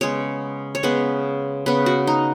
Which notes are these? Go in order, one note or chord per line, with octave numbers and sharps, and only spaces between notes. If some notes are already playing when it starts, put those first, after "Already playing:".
C#3 G#3 B3 C#5
C#5
C#3 G#3 B3 B4
C#3 B3 B4
F#4
D#4